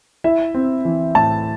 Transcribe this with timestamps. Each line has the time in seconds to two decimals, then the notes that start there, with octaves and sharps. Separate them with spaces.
0.24 E4 E5
0.55 C4
0.85 E3
1.15 A2 A5